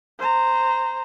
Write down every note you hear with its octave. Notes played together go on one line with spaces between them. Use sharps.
C5 A#5